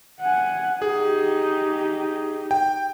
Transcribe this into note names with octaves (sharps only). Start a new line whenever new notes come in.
F#5 G#5
D#4 G4 G#4
G5